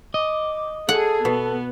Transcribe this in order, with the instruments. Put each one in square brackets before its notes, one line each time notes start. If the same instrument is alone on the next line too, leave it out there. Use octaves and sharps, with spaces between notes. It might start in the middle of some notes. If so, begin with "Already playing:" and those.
[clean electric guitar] D#5 [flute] D6
[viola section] G#4 [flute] A4 [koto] F#5
[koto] B2 [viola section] B3